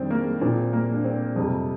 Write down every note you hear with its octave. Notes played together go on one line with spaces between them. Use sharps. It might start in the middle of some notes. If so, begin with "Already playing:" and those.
Already playing: F2 D#3 G3 C4 D4
A#3
A#2 F3 C4
A#3
D4
C4
F2 C3 G3